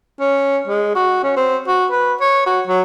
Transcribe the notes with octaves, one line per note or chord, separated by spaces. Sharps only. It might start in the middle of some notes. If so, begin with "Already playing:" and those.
C#4
G#3
F#4
C#4
C4
F#4
B4
C#5
F#4
F#3